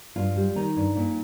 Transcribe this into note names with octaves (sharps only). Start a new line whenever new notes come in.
G2 F4
G3
D#3 D#4
G2
A#2